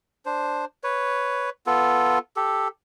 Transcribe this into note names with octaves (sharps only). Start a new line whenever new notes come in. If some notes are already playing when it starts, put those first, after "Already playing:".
D4 C5
B4 C#5
B3 F4 A4
G4 A4